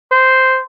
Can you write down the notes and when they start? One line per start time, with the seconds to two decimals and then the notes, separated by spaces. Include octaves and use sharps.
0.12 C5